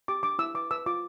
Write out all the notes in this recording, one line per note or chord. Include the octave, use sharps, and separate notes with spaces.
G4 D6
D4 D6
E4 E6
B4 D6
B4 E6
F4 D6